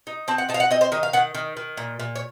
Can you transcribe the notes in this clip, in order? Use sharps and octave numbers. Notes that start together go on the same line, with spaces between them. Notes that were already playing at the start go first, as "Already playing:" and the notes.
D#4
C4 A5
F#5
D#4 A5
F5
F#5
C4 D#5
C5
D#3 D#5
F5
D#3 F#5
D#3
D#3
A#2
A#2
C#5